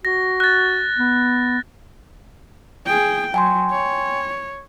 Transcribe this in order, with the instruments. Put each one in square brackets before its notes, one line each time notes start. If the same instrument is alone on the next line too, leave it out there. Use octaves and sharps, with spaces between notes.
[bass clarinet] F#4 [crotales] A#6
[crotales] F#6 A6
[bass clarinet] B3
[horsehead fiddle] G#4 G5
[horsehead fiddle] F#3 [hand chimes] G5 G#5 C6
[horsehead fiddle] C#5